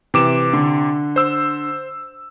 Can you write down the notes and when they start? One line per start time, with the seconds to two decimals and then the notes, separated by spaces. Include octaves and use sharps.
0.14 C3 E3 D6 E7
0.53 D3
1.16 C5 E6